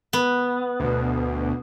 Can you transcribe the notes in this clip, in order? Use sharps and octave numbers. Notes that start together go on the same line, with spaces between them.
B3
D2 B2